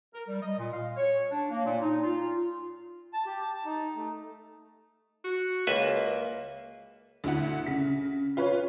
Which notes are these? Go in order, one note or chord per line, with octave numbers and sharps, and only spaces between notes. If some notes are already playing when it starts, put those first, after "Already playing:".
A#4
G3
D#5
A#2
F5
C#5
D4
A#3
A#2
D#4
F4
A5
G4
A5
A5
D#4
A3
F#4
C#2 A#3 B4 E5
D2 E4 F#5
C#3 B6
F4 B4 C#5